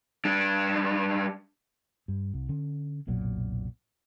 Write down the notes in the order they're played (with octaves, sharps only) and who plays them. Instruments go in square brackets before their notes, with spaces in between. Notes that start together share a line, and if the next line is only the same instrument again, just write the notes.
[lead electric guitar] G3 D4
[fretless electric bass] G2
C2
D3 C#4
F1 B1 A#2 F#3